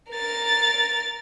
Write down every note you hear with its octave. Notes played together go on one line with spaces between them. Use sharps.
A#4 A6